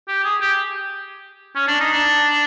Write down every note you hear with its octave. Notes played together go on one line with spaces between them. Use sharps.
G4
G#4
G4
C#4
D4
D#4
D4